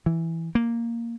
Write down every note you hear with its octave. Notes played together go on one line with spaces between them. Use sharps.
E3
A#3